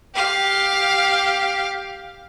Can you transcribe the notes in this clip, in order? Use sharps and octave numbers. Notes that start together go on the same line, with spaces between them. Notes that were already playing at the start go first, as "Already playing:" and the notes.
G4 F5